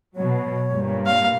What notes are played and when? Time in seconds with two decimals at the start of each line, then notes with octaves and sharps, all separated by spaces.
0.16 B2 F#3 C#5
0.71 G2 A#2
1.06 F5